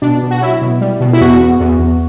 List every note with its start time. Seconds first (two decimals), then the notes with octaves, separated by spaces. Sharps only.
0.02 B2 D4
0.23 B2
0.31 F#4
0.41 F#3 E4
0.62 B2
0.81 G3
1.01 B2
1.13 E4
1.21 E2 F#4
1.41 E2
1.60 E2
1.79 E2